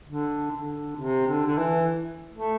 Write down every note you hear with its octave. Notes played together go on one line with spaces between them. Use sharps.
D3
D3
C3
D3
D3
E3
A3